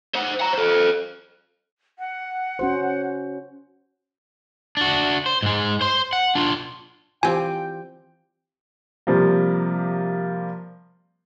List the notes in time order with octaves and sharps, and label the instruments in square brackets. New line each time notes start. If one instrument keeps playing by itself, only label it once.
[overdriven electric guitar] C5 F#5
F#5 A#5
A4 C5
[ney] F#5
[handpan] C#4 F#4 C5
[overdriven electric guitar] D4 F#4
C5
G#2 G#3
C5 C6
F#5
D4 F4
[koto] E3 C4 [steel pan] F4 G4 C5 [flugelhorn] G5 [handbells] G#5
[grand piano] C3 F3 G3 A#3